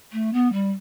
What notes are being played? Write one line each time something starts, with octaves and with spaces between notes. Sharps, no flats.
A3
B3
G3